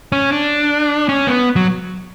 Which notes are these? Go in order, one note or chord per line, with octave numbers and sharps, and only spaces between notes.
C#4
D4
C#4
B3
F#3